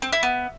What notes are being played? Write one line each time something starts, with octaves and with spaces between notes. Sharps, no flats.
C4
E4
B3